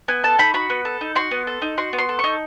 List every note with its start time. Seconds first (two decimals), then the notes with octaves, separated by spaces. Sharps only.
0.08 B3 G#5
0.24 A4 A5
0.39 D#4 B5
0.54 F#4 B5
0.70 B3
0.85 A4
1.01 D#4
1.15 F#4 C6
1.31 B3
1.47 A4
1.62 D#4
1.78 F#4 C6
1.93 B3
1.98 C6
2.09 A4
2.19 D#4 C#6